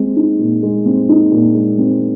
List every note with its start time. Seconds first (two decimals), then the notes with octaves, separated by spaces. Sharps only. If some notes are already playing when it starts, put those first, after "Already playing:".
Already playing: G#3 C4
0.16 D#4
0.39 A#2
0.63 G#3
0.86 C4
1.09 D#4
1.31 A#2
1.55 G#3
1.78 C4